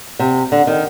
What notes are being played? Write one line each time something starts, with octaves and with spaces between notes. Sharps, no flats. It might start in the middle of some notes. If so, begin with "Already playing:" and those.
C3
D3
D#3